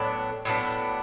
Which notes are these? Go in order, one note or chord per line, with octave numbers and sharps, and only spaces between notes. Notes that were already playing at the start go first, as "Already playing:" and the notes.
Already playing: A2 F#3 B3 D4
A2 F#3 B3 D4